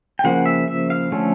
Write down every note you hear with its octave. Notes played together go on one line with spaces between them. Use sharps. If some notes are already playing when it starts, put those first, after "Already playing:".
G5
C#3 F3 A#3 F#5
E5
E5
F5
D3 F3 A3 C#4